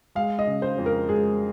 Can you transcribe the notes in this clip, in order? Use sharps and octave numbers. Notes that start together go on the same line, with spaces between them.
G#3 F5
D#5
C#3
C5
F2
A#4
G#3 G#4